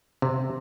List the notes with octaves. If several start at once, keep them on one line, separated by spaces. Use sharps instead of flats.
C3